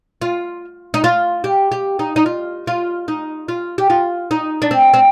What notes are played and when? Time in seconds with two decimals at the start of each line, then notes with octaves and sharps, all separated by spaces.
0.22 F4
0.94 D#4
1.04 F4
1.44 G4
1.72 G4
1.99 D#4
2.16 D#4
2.26 F4
2.67 F4
3.08 D#4
3.48 F4
3.78 G4
3.90 F4
4.31 D#4
4.62 D4
4.71 C4
4.94 C4